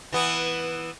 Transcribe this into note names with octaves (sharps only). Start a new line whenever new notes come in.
E3 B3